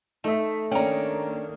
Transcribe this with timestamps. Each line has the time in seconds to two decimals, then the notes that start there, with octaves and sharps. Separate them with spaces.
0.24 A3 D#4 E5
0.71 D#3 A#3 C#4 D4 G5 A#5